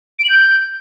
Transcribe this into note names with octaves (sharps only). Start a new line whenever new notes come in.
D7
F#7
G6